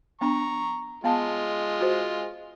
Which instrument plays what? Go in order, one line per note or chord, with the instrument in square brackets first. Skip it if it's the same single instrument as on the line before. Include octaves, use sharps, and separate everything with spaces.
[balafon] B3 D4 [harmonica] A#5 C#6
[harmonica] G#3 F4 [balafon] B3 F5 A5
[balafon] F#4 C5